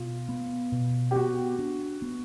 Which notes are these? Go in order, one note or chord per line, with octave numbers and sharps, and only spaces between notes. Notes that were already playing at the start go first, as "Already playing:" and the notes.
Already playing: B2 F4
B3
B2
G4
B3 F#4
D4
B3